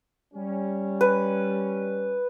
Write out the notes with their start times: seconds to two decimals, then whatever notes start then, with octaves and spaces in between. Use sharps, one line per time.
0.34 G3 C#4
1.01 B4